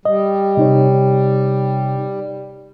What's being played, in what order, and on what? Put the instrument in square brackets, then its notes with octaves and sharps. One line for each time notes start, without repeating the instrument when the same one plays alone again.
[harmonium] G3 [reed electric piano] D#5
[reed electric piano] C3 D#4 C#5